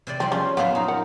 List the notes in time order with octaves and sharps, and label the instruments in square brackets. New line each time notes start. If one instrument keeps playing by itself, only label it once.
[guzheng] C3 C5 D5
[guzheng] F3 G3 [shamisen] C4 [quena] C6
[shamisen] C#3 [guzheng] C#4
[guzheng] F#2 A#2 C5 [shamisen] B3 F4 [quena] F5
[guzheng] D#4 [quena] A#5
[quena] A#4 [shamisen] F#5